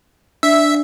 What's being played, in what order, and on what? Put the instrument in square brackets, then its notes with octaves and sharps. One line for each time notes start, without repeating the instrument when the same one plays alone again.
[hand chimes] D4 [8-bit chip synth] E5